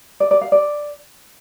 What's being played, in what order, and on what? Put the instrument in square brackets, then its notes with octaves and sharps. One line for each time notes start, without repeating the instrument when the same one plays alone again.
[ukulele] D5
D5
F5
D5